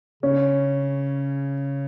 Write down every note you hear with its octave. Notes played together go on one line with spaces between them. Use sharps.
C#3 C#4